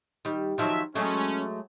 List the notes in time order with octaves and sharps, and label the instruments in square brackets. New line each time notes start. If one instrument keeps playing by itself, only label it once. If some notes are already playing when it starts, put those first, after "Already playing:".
[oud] D#3 G3
[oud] D#3 F3 F#3 [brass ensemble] F4 E5
[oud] F#3 G#3 A3 [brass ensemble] C#4